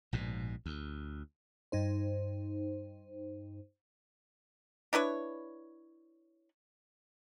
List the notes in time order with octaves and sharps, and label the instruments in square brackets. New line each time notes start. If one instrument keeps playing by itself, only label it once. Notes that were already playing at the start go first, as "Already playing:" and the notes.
[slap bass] A#1 G#2 B2
D2
[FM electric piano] G2 D#4 C5
[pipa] D4 E4 B4 C#5